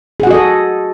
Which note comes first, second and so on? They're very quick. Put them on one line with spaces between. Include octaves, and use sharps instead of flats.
G#4 F#5 F#4 D#5 A4